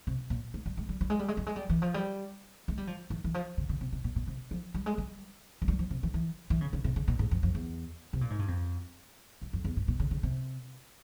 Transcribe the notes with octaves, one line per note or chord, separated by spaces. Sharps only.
C3
A#2
G#3
G3
G#3
G3
G3
G#3
G3
G#3
G3
G#3
G3
E3
F3
G3
G#3
G3
F3
E3
E3
F3
C#3
C#3
C3
C3
A#2
A#2
C3
F3
G3
G#3
G3
G#3
G3
F3
C3
E3
E3
E3
C#3
C#3
C3
C#3
A#2
G#2
F2
F2
E2
C3
A#2
G#2
G2
F2
G2
F2
E2
G#2
A#2
C#3
C#3
C3